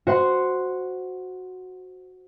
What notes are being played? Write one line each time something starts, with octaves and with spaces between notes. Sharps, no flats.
F#4 C5 F#5 C6